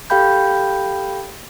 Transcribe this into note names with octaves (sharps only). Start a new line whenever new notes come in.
G4 A4 F5 G5 B5 G6